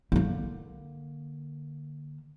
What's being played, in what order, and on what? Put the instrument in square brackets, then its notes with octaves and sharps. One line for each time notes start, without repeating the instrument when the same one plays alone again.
[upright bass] D3 A#3